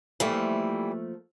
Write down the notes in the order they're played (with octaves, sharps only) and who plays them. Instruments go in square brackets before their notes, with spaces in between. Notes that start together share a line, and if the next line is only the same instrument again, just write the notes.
[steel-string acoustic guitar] E3 G3 [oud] F3 A3 A#3